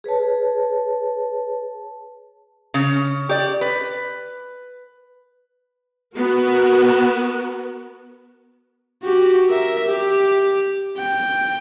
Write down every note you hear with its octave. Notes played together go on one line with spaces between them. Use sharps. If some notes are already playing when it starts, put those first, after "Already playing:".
G#4 B4 C#5 A5
C#3 C#4
G4 D5
B4
B3 F#4 A#4
F#4 G4
A#4 E5
G4
G5